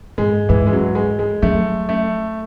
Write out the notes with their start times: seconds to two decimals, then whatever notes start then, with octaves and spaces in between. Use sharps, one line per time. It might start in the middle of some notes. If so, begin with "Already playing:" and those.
0.18 G#2 G#3
0.49 G#2 E3
0.67 G#3
0.73 F#3
0.95 G#3
1.19 G#3
1.42 F#3 A3
1.89 A3